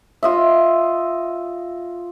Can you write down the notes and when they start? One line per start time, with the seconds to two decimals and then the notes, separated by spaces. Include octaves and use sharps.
0.23 F4 D#5 E5